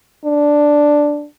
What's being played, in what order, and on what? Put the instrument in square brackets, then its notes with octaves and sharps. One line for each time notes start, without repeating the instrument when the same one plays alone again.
[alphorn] D4